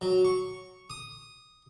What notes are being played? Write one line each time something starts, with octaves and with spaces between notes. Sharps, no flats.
F#3
C#6
D#6